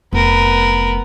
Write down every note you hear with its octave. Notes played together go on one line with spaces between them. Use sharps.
F1 B3 A#4